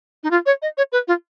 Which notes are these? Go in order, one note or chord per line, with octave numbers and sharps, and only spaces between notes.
D#4
F4
C#5
D#5
C#5
B4
F4